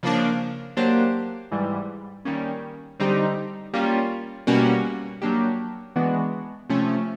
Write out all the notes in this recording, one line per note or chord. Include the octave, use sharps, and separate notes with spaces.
C#3 F3 A#3 D4
F#3 A#3 D4 G4 C5
G#2 E3 G3
D#3 G3 A#3 C#4
D3 G3 C4 D#4 G4
G3 A#3 C#4 F4
B2 G3 A#3 C#4 F#4
F#3 A#3 D4 G4
E3 G#3 B3 D4 F#4
C3 F3 A3 C#4